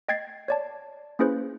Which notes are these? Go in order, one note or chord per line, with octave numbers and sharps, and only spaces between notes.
D#5 G5 G#6 A6 C7
C#5 D5 A5
A#3 C#4 E4 G#4 B4 C5